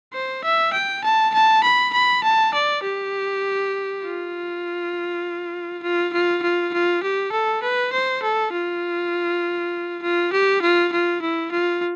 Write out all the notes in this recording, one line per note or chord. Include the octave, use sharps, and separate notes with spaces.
C5
E5
G5
A5
A5
B5
B5
A5
D5
G4
F4
F4
F4
F4
F4
G4
A4
B4
C5
A4
F4
F4
G4
F4
F4
E4
F4